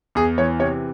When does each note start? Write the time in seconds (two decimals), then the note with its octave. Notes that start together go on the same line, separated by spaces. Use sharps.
0.15 E2 G#4
0.38 E3 C#5
0.60 C3 C#5